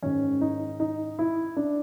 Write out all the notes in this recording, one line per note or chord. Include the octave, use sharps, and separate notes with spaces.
G#2 D#3 C#4
D#4
D#4
E4
D4